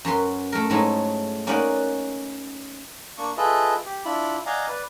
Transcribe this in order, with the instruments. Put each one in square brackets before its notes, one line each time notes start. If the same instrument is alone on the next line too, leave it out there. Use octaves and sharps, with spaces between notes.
[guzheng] F#2 F#4 B4 C6
A3 A#4
G#2 F#3 G#3 A3 E4
A#3 C#4 D#4 B4 D5 F#5
[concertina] A#3 D4 C#6
F4 G#4 A4 B4 D#5 E5
G4
D4 E4 F4 B5
D5 D#5 F5 F#5 G#5 A#5
B4 D5